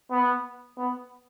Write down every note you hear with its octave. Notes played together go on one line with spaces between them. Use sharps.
B3
B3